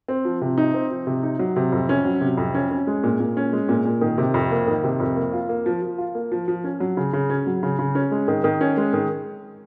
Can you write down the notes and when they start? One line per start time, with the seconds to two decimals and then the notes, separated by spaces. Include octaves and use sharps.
0.08 C4
0.25 F3
0.42 C3
0.58 D#4
0.74 C4
0.90 F3
1.07 C3
1.23 D#4
1.39 F#3
1.56 C3
1.72 F2
1.89 C#4
2.05 F#3
2.21 C3
2.38 F2
2.54 C#4
2.71 C#4
2.87 G#3
3.04 A#2
3.20 A#2
3.37 C#4
3.53 G#3
3.69 A#2
3.85 A#2
4.01 D#3
4.18 C3
4.34 F2
4.51 A#3
4.68 D#3
4.84 C3
5.00 F2
5.17 A#3
5.33 F4
5.49 A#3
5.66 F3
5.82 F3
5.98 F4
6.15 A#3
6.32 F3
6.48 F3
6.64 C#4
6.80 F#3
6.97 C#3
7.13 C#3
7.30 C#4
7.47 F#3
7.63 C#3
7.79 C#3
7.95 C#4
8.11 G#3
8.28 D#3
8.44 D#3
8.61 C#4
8.77 G#3
8.93 D#3